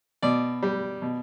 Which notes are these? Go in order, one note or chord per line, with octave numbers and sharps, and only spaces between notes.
B2 D5
G3
B2